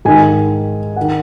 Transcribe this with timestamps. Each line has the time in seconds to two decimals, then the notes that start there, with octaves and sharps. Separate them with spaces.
0.05 G#2 D#3 G#5
0.96 D#3 F#5